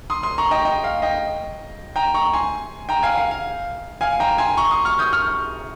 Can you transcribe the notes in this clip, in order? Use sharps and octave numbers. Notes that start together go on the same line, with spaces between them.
C6 D#6
C6 D#6
A#5 C#6
D#5 G5
D#5 G5
F5
D#5 G5
G5 A#5
A#5 C#6
G#5 C6
G5 A#5
F5 G#5
F5
F5
F5 G#5
G5 A#5
G#5 C6
A#5 C#6
C6 D#6
C#6 F6
D#6 G6
C#6 F6